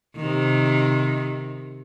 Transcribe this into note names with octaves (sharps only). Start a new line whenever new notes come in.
C3 D#3